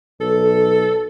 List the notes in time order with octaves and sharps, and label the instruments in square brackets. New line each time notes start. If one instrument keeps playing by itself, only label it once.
[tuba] B1 [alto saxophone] A4